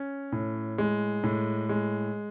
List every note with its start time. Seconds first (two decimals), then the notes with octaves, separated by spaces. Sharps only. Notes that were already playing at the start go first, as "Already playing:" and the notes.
Already playing: C#4
0.32 A2
0.78 G#3
1.23 A2
1.69 G#3